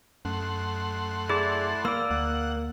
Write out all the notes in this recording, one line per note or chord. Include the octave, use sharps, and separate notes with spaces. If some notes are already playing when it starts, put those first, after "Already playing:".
F#2 A3 F#5 C6
E4 G#4 D5
A#3 D5 E6
D2 F#5